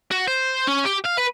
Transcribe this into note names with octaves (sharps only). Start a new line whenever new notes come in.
F#4
C5
C#4
G4
F5
B4